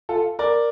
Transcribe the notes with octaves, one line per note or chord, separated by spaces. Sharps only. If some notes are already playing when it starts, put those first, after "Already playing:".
F4 A4
A#4 D5